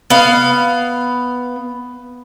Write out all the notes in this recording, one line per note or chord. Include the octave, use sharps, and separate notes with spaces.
B3 F5